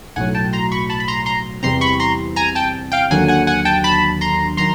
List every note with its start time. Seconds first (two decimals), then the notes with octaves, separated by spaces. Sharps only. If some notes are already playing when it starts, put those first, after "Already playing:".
0.16 B1 A2 F#3 F#5 G#5
0.34 G5 A5
0.53 A#5 C6
0.72 B5 C#6
0.90 A5 B5
1.00 B5
1.08 A#5 C6
1.26 A#5 C6
1.63 E2 C3 E3 G3 C4 A#5 C6
1.81 B5 C#6
2.00 A#5 C6
2.36 G#5 A#5
2.55 G5 A5
2.92 F5 G5
3.11 D#2 D3 F#3 F#5 G#5
3.28 F#5 G#5
3.47 F#5 G#5
3.65 G5 A5
3.84 A5 B5
4.21 A#5 C6
4.57 D#3 F#3 A#5 C6